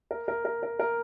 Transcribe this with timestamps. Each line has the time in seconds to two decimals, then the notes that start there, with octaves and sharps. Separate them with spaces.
0.11 A#4
0.28 A#4
0.45 A#4
0.63 A#4
0.80 A#4